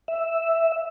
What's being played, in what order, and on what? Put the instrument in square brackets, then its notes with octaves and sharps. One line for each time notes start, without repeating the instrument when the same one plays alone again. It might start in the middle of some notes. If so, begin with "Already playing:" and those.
[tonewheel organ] E5